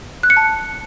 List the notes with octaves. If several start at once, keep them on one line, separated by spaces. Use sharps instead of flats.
F#6
C#7
A5